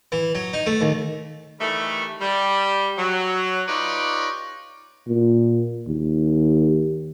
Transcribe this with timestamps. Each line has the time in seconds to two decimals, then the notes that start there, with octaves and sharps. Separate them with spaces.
0.12 E3
0.35 F#3
0.53 D#4
0.66 A3
0.81 D#2
1.60 D#3 E3 G3 A3
2.21 G3
2.98 F#3
3.68 D#4 F4 G4 B4 C#5 D5
5.07 A#2
5.87 D#2